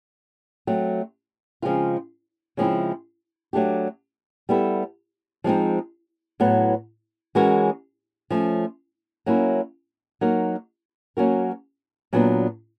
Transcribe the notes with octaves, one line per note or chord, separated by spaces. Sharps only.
F#3 A3 C4
C#3 F3 G#3 C4 F4
C#3 F3 G#3 C4 E4
F#3 A3 D4 G4
G3 B3 E4 A4
F3 G#3 C4 D#4
A2 F#3 B3
E3 G#3 C#4 F#4 A#4
F3 A3 C#4
F#3 A#3 C#4 E4
F#3 A#3 D#4 F#4 A#4
F#3 A#3 C#4 F#4 A#4
A#2 F#3 B3 D4